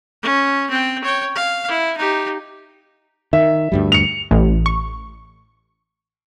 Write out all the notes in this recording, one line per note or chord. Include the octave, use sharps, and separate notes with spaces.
C#4
C4 G5
C#5 G5
F5
E4
D#4 G4
D#3 E5
D2 G2 G3
C#7 F7
A1
C#6